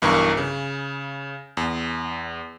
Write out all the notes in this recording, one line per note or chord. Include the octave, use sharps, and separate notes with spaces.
B1 G2 E3 A#4 C#6
C#3
E2